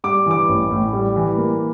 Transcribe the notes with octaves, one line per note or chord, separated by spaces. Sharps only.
G3 D6
E3 D6
A1
A2
G3
E3
A#3